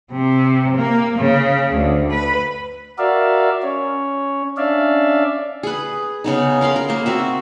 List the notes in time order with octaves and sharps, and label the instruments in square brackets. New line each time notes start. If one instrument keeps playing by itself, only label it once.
[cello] C3
A#3
C#3
D2
B4
[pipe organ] F#4 A#4 D5 E5 F5
C#4 C#5
C#4 D4 D5 E5 F5
[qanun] G#4 B4
C#3 B3 D#4
A#4 F5 B5 C6
A#4
A#3 C5
C4 F#4 E5